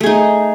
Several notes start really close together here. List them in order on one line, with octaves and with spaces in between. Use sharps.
A3 G#4 D#4